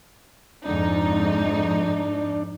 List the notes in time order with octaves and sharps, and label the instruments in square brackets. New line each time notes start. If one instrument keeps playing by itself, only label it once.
[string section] F2 G#2 D#4 [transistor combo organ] D4